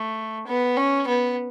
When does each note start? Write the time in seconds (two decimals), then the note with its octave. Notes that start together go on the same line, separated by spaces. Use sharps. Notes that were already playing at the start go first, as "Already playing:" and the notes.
Already playing: A3
0.47 B3
0.77 C#4
1.08 B3